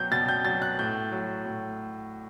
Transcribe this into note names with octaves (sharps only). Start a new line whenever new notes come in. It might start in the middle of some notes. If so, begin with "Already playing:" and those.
Already playing: B2 F#3 G6
B2 A6
G6
F#3 A6
F#6
A2 G6
F#3
A2